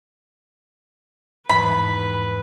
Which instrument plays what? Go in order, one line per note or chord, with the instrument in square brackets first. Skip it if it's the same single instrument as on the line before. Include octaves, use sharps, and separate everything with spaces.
[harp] E2 G#2 [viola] B4 [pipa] B5